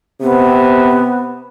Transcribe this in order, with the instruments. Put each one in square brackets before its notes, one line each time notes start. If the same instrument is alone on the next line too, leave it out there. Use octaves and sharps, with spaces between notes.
[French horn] C3 [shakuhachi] B3